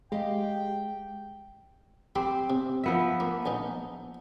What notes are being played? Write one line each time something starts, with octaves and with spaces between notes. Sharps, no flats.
G#3 G4 D#5 F5 G5
C4 G4 B5
C3
F3 B3 E5
A#3
A#1 E3 D#4